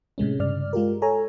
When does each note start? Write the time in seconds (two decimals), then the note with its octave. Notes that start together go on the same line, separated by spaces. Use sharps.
0.18 A2 C3 G#3 C#4
0.39 G2 C#3 D5 F6
0.73 G#3 F4 G4 A#4
1.02 A4 C#5 G#5 A#5